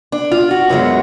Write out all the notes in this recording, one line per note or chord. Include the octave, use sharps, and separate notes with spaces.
D4
F4
F#4
F#2 C#3 G#3 B3